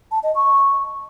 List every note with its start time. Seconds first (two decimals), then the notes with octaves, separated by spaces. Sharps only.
0.11 A5
0.23 D#5
0.35 C#6